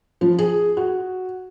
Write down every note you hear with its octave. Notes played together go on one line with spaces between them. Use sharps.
F3
G#4
F#4